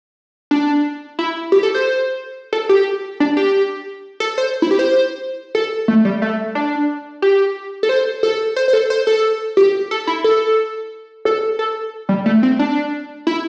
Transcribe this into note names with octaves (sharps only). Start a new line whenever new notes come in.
D4
E4
G4
A4
C5
A4
G4
D4
G4
A4
C5
E4
G4
C5
A4
A3
G3
A3
D4
G4
A4
C5
A4
C5
C5
A4
C5
A4
G4
A4
E4
A4
A4
A4
G3
A3
C4
D4
E4